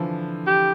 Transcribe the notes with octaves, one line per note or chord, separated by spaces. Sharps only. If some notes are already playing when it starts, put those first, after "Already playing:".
Already playing: D3 E3 F3
G4